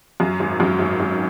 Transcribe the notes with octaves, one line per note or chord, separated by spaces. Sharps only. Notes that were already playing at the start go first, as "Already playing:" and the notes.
F#2
G#1
F#2
G#1
G#1